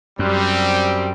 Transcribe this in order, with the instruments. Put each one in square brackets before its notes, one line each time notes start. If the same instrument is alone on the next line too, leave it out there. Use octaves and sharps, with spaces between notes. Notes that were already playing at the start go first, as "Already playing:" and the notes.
[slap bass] F#2 [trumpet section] G3 C4